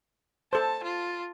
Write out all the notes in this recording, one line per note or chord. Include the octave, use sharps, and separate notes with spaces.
A4 C5 A5
F4